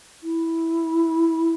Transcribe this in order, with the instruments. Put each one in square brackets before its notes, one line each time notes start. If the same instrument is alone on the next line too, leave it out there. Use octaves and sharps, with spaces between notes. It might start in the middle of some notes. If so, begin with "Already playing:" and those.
[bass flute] E4